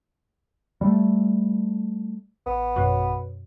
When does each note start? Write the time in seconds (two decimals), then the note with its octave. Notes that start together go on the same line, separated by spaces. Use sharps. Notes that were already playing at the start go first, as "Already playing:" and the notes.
0.81 G3 A3
2.46 A1 B3
2.76 F#2 B2